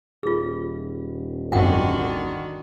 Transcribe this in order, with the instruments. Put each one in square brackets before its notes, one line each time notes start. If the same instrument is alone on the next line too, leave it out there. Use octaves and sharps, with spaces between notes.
[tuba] D#1 [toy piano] F4 G#4
[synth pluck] G#1 F#2 [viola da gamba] D3 D#3 F#4 [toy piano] F#5 G5